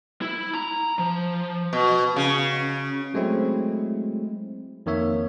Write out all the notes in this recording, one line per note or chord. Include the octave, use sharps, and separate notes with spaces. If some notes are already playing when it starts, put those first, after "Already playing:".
E4
A#5
F3
B2
C#3
F#3 G#3 A3 C4 E4
F2 D#3 A#3 C#5 E5